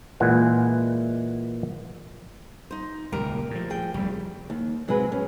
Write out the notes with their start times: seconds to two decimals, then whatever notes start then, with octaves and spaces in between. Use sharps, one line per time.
0.20 A#2 E3 G#3 F#5
2.71 D#4 C5
3.12 D#1 C#2 B2 G4 A#4
3.51 A2 F3
3.70 G#4 G5
3.94 F1 E2 G3
4.50 D#2
4.88 C3 F#3 G#3 G#4 B4
5.12 C#4